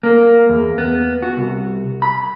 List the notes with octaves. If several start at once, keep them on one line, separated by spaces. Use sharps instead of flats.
A#3
E2
B3
F#4
C2
B5